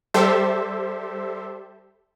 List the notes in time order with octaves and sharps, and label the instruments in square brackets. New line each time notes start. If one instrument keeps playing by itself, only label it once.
[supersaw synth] G3 G4 A4 C5 E5